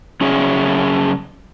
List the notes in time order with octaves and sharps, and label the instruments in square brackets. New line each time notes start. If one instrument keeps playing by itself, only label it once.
[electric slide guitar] C#3 F#3 C#4 G#4 C#5 E5